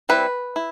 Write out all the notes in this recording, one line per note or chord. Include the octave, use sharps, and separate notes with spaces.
G3 C4 E4 B4
E4